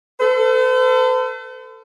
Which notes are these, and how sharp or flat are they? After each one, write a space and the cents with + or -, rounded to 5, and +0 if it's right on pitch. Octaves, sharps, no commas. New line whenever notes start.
A4 +30 C5 -45